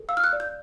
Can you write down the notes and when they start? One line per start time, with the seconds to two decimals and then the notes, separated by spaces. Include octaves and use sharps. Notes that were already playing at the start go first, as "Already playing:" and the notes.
Already playing: A4
0.09 F5 E6
0.17 F6
0.24 F#6
0.33 D5
0.40 G6